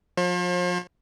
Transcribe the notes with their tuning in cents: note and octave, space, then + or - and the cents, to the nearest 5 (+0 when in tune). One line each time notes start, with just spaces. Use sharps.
F3 +35 C5 +45